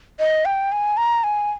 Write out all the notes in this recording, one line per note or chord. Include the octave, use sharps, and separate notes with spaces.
D#5
G5
G#5
A#5
G#5